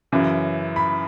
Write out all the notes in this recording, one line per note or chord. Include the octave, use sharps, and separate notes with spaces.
F#2 C#3 E3
B5